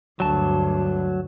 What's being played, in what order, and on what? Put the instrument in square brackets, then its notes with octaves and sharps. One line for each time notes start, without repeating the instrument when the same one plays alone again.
[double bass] D2 G2 [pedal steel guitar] F#3 A5